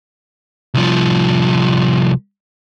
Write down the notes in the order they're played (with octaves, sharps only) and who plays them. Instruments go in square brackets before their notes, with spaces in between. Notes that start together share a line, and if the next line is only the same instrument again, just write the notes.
[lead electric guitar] C2 F3